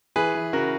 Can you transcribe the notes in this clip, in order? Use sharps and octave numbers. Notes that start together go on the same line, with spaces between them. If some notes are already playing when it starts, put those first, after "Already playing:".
E3 G#4 B4
E3
C#3 F#4 A#4